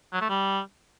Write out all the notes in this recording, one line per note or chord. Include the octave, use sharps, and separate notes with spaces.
F#3
A3
G3